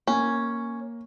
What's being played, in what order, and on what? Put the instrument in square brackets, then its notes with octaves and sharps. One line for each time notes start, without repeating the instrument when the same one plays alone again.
[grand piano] A#3 [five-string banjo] C#4